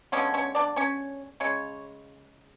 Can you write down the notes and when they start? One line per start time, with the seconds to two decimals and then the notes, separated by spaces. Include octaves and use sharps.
0.12 D3 F3 G#3 B3 C#4 C#5
0.34 C#4 C#5
0.55 D4 D5
0.76 C#4 C#5
1.40 C#3 G#3 C#5